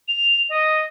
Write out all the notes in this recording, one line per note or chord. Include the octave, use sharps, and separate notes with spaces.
F7
D#5